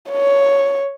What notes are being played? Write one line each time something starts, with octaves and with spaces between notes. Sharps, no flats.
C#5